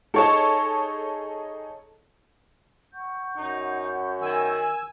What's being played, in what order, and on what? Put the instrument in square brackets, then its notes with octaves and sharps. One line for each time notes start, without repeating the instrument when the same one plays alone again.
[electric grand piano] D#4 G#4 D#5 [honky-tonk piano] A4 C#5 A5
[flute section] F#5 C#6 G6
[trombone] F#2 [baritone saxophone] D#4
[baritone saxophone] D#3 [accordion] G#5 E6